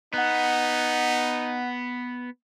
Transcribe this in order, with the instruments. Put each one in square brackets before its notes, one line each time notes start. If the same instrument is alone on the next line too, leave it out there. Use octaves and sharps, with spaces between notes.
[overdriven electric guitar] B3 [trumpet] D#4 [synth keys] F#5 F#6